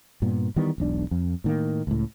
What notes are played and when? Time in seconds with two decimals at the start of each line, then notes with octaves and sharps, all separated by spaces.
0.22 G2 A#2 B3
0.56 D#3 E3 G3 B3
0.78 E1 B1 D4
1.11 F2
1.44 A2 D#3 A#3
1.87 C#2 A2